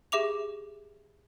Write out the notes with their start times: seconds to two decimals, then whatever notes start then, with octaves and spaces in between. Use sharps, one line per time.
0.12 G4 G#4 E5 D6 F7